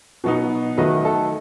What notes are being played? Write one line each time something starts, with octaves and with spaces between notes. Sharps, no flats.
B2 F#3 B3 D#4
D#3 F#3 A3 B4 D#5
A4